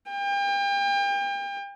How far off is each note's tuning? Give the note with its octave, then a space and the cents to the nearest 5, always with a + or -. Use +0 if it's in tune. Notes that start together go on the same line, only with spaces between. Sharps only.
G5 +35